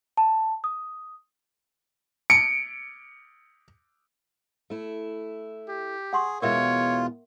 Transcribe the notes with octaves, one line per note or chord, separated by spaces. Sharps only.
A5
D#6
C#7 D7
A3 E4
G4
G#4 F#5 C6 C#6
E2 B2 G#3 F4 A#4 C#5 E5